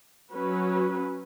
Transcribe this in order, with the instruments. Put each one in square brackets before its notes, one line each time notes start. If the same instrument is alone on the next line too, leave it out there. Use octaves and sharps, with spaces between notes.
[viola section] F#3 C#4 F#4 B4